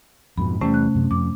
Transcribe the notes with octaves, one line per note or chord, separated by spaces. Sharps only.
F2 G#2 B2 B5
E2 C3 E3 G3 A3 C#4
F#6
F#2 C3
F2 D6